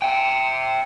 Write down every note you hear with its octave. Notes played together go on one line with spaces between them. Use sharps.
E5 G5